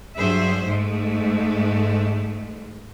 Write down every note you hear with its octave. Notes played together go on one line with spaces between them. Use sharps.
G2 F#3 G#4 C5 E5
G#2 G#3 A3